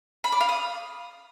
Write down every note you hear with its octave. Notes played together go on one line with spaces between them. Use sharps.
B5
D5
F5
D#6